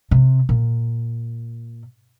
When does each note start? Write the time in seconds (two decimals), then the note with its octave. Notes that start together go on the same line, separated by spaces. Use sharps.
0.11 C3
0.49 A#2